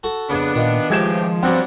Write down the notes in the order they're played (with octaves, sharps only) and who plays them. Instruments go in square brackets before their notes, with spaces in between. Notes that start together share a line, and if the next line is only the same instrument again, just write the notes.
[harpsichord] F#4 A4
[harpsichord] F2 C#3 [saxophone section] B3 D4
[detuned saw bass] A#2 [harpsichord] D#3 F4
[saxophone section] A2 E3 G4 [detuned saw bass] F3 [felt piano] G#3 G#6 E7
[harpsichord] F#3 G3 G4 [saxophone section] B3 D4 F#4 [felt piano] C4